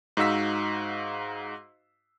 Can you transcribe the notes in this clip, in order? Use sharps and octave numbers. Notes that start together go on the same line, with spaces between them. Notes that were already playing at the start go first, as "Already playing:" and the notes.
G#2 D#4 F#4 F5 E6 B6